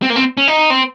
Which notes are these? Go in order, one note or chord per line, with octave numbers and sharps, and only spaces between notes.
C4
A#3
C4
C#4
D#4
C4